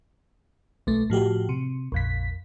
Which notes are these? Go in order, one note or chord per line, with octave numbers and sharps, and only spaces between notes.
B1 A3
A2 F3 F#4 G4
C3
A#1 F2 B6